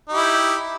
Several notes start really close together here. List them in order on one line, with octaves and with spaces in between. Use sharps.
D#4 G4 E4